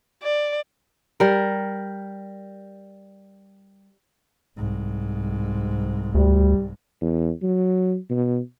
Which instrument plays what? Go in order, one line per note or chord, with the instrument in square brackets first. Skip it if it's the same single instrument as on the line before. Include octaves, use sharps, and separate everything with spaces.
[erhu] D5
[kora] G3 A#4
[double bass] C2 G#2
[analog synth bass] D2 [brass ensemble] G3
[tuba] E2
F#3
B2